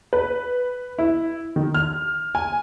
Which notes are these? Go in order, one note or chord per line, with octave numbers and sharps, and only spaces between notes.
B4
E4
D#3
F6
G#5